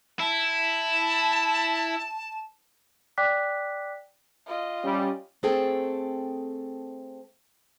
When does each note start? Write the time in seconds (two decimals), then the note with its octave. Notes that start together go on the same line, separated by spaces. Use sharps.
0.20 E4 A5
3.18 D5 G5 D6 F#6 B6
4.46 F4 D#5
4.84 G3 C#4
5.43 A3 C4 G#4 A4 G5